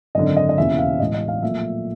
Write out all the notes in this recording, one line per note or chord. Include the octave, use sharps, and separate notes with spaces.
G#1 F#2 D3 D#5
D#5
D#5
E1 D#2 C#3 E3 E5
F5
A1 G#2 E3 D#5
D#5
F5
A#1 A#2 F#3 A3 E5